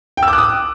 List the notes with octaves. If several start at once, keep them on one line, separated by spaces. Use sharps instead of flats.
G5
E6
D6
F#6
D#6